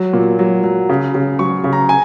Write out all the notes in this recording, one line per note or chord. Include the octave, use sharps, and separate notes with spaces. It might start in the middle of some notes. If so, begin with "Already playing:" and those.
Already playing: F#3
A#2
F#3
F#3
C#3
C#3
F#3 C#6
C#3
A#5
G#5